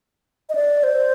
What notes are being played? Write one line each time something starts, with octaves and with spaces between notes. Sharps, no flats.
D#5
D5
C5